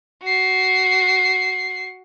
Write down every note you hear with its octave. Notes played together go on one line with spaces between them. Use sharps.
F#4 C7